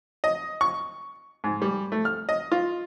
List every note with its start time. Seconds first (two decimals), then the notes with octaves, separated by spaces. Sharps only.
0.24 D#5
0.61 C#6
1.44 G#2
1.62 G3
1.92 A3
2.05 F6
2.29 D#5
2.52 F4